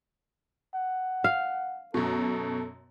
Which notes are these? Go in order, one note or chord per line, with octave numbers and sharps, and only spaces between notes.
F#5
F5
F#2 B2 A4